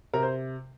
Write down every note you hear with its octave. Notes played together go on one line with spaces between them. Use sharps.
C3 A#4
C5